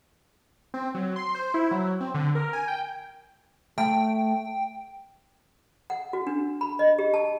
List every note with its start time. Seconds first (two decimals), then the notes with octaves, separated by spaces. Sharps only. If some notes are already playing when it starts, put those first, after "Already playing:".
0.74 C4
0.95 F#3
1.16 C6
1.35 C5
1.54 E4
1.71 F#3
2.00 C4
2.14 D3
2.35 A#4
2.53 G#5
2.68 G5
3.78 A3 G5
5.90 F#5
6.13 F#4
6.27 D4
6.61 B5
6.79 D#5
6.99 G4
7.14 A5